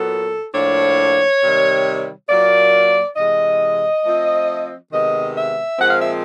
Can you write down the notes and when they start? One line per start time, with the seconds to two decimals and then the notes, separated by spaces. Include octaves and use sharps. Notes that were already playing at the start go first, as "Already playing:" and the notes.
Already playing: A#2 F#3 B3 A4
0.53 A2 F3 A#3 D4 C#5
1.42 C3 D#3 G3
2.28 A#2 F#3 A#3 D5
3.16 C3 E3 G#3 D#5
4.03 F3 A3 C4 F4
4.91 C3 D#3 G#3 B3 D#5
5.35 E5
5.79 A#2 F3 G#3 C4 F#5
5.89 F5
6.01 E5